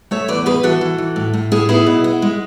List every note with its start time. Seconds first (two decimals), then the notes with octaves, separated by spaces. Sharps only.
0.11 A3 C#5 E5
0.28 E2 B4 D5
0.46 B3 G#4 B4
0.63 E3 F#4 A4
0.81 E3
0.98 E3
1.16 A2
1.34 A2
1.52 A2 E4 G#4
1.69 B3 E4 G#4
1.86 B2
2.04 B3
2.22 G#3